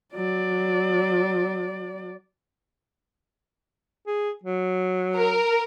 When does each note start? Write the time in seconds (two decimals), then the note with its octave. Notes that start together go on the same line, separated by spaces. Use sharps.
0.14 F#3 D5
4.07 G#4
4.44 F#3
5.15 A#4